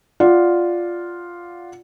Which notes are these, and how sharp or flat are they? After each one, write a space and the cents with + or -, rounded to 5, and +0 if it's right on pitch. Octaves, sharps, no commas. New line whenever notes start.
F4 +0 D5 +0 F#5 +0